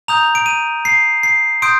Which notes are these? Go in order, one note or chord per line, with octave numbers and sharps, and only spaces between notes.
A#5 D#6 G6 F7
D7
D#7
C7
C7
C6 D#6 G6 D7